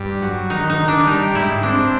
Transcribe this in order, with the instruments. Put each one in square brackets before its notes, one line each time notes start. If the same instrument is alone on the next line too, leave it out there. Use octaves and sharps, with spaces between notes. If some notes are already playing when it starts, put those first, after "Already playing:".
Already playing: [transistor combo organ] G2
F#3
[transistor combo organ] D#3 [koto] D#4
[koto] D#4
[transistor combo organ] D#3
[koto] D4
[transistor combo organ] G3 [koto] D#4
[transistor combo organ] G#2 [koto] E4
[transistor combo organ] C4 [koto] D4